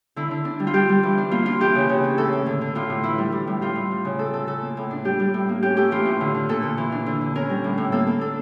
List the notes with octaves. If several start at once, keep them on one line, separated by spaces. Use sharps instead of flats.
D3 E4
D3
D4
G3
F4
G3 G4
G3
E3
D4
A#3 F4
D4 F4
E3 G4
C#3
C#3
C#4
A2 A4
A2
D3
D3
A2 F4
A2
E3 E4
G3
G3
A2
G3 F4
A2
G3
C#3
A3 A4
A2 A4
C#3 A4
A#3
A2
D4
G3 G4
G3
A2
A#3
C#4 G4
A3 G4
E3 F4
A2
D3
D3
A#2 A4
A#2
E3
D4
D3
D3
C#4 A#4
G3
A2
A2
A#3 A4
A#3
D4 A4